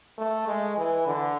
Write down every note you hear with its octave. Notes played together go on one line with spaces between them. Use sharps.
A3
G#3
E3
D3